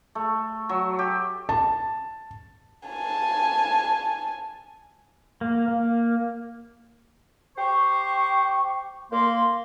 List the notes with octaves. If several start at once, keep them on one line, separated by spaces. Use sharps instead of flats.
A3
F#3
G4
A5
G#5 A5
A#3
A#3
G4 C5 C#6
A#3 C6